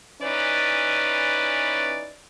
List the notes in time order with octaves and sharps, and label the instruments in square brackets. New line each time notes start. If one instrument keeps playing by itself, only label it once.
[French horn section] E3 C#4 D#4 B4 D5